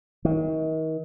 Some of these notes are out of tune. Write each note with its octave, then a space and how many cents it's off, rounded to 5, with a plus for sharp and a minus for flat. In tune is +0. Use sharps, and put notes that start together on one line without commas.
D#3 +35